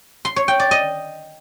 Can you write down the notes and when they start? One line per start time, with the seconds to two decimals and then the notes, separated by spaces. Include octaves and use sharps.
0.25 C6
0.36 C#5
0.48 G5
0.60 D5
0.71 D#5